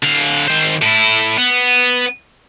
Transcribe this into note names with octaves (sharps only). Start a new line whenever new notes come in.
D3 F5
D#3 C5
A2 E4
B3